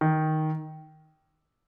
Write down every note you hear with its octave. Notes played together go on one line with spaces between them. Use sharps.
D#3